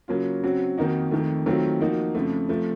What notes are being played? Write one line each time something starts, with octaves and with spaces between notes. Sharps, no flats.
C#3 F#3 A#3 C#4 F4
C#3 F#3 C4 F#4
F2 D#3 A#3 D#4 F#4
F2 D#3 A3
D#3 F#3 A3 C4 F4
F3 A#3 D#4 F#4
F2 C#3 F3 A3
C3 F3 A3